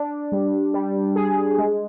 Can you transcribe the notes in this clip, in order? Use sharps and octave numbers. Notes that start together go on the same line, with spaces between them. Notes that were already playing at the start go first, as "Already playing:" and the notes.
Already playing: D4
G3
G3
G#4
G#3